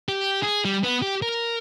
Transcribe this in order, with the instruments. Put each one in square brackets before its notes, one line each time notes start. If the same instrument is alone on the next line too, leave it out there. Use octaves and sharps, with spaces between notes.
[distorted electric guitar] G4
G#4
G3
B3
G4
A#4